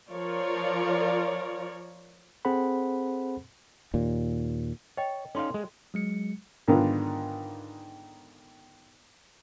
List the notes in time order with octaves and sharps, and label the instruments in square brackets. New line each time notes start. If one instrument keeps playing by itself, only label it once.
[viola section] F3 F4 A#4 C#5 D5
[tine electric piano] C4 G#4 A4 C5 F#5 B5
[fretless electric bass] D#2 A#2
[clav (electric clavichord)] C#5 [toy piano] D#5 G5
[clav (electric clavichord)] C#4 D#4 F5 [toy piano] A4 C6
[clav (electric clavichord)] G#3
[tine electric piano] F#3 G#3 C#7
[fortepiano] G#2 D3 D#3 B3 F4